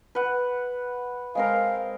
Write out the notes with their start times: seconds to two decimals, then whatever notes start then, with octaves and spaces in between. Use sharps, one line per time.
0.15 B4 F#5
1.35 G#3 C4 A#4 F5